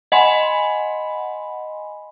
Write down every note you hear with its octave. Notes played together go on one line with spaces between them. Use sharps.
D#5 F#5 G#5 B5 C6